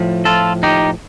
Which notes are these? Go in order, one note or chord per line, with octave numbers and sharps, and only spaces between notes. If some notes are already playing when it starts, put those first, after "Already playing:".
Already playing: A2 F3
F4 A4
D#4 G4